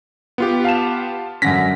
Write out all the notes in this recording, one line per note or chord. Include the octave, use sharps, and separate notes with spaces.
B3 F4 G4
F5 A5 E7
F#2 D3 C#4 A#6 B6